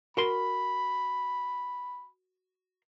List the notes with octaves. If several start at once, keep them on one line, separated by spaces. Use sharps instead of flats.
F#4 A#4 B5 C6